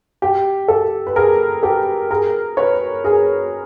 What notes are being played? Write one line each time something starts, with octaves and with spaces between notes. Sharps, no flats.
G4
G4 A4
B4
G#4 A#4
G4 A4
G#4 A#4
B4 C#5
G#4 A#4